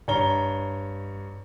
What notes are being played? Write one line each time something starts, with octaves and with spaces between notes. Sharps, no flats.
G2 C#5 A#5 G7